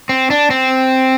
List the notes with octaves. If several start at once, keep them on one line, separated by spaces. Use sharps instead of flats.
C4
D4
C4